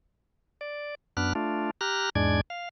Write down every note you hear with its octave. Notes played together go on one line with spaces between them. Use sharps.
D5
F#2 B3 D4 F6 F#6
A3 D4 F4
G4 A#5 F6 F#6
E2 G#2 G#3 D4 D5 G#6
F5